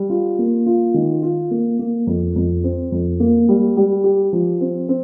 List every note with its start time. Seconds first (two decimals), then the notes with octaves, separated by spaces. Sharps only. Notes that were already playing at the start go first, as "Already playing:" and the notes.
Already playing: G3
0.10 F4
0.39 A#3
0.66 F4
0.94 D#3
1.23 F4
1.51 A#3
1.79 A#3
2.07 F2
2.36 F2
2.64 C4
2.92 F2
3.20 A#3
3.49 G3
3.77 G3
4.04 G4
4.33 F3
4.61 C4
4.89 C4